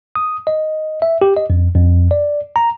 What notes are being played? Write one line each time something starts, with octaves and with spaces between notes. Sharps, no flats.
D#6
D#5
E5
G4
D#5
F2
F2
D5
A#5